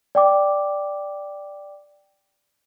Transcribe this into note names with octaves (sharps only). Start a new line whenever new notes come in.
D5 G5 D6